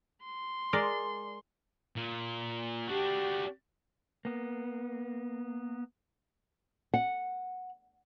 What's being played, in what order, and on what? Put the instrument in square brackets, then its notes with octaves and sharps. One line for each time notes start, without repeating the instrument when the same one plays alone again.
[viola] C6
[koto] G#3 A#4 D5
[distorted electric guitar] A#2
[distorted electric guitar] D4 F#4 [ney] G4
[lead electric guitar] A#3 B3
[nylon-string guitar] F#5